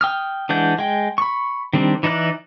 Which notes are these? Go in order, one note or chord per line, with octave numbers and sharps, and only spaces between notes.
G5 D#6 F6
E3 G#3 D4 F#5 G6
G#3 G5
B5 C#6
D#3 G3 C4 D4
E3 D#4 E4 D5 F#6